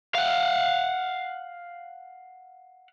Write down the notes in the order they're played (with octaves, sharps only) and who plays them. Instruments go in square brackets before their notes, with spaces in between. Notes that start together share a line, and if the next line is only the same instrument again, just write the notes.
[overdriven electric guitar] F5 F#5